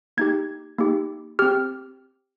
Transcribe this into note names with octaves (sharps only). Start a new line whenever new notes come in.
A#3 D#4 G4 G#6
A#3 D#4 G4
C4 G4 F6